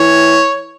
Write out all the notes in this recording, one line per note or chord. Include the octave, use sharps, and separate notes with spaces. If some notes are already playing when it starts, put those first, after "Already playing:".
Already playing: E3 C#5